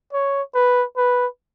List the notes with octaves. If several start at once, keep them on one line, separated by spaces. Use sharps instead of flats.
C#5
B4
B4